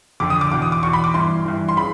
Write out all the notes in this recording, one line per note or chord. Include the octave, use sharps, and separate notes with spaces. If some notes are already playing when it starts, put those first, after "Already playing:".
F2 D3 D6
D#6
D6
E2 B2 D6
D#6
D6
E2 B2 C#6
B5
D6
G2 E3 C6
G2 E3
C6
C#3 E3 B5